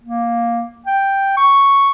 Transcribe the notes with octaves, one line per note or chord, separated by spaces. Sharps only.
A#3
G5
C#6